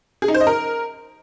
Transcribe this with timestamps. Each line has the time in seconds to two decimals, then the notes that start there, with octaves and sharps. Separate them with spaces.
0.22 G#4
0.28 D#4
0.34 C5
0.41 D#5
0.47 A#4